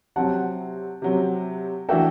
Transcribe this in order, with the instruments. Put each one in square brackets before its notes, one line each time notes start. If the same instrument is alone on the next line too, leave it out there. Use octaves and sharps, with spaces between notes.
[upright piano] C3 F#3 C4 [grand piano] F#5 A5
[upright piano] C3 F#3 C4
[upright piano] E3 A3 D4 F#4 A4 [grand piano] E5 G5